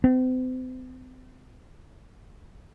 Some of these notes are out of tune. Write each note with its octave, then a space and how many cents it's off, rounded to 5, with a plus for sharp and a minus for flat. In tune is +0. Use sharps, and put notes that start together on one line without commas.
C4 -40